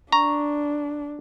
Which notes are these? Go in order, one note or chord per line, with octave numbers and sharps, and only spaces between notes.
D4 A#5 C#6